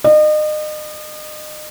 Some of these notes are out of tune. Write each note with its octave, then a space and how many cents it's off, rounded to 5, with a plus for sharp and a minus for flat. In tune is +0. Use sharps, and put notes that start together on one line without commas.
D#5 -35